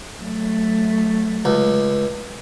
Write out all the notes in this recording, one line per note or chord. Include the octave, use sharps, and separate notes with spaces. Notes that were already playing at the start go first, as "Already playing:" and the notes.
F#3 A3
C#2